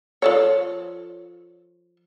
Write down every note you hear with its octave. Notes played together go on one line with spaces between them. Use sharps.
F3 A4 C#5